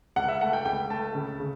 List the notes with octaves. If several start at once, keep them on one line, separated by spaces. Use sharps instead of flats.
C#2 F#5
E5
A3 F#5
G5
C#2 G5
A3 A5
C#3
C#3